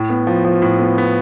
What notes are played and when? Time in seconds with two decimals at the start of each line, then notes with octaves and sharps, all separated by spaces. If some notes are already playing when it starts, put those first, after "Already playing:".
Already playing: A2
0.10 B3
0.27 F3
0.45 F3
0.62 A2
0.79 B3
0.98 B3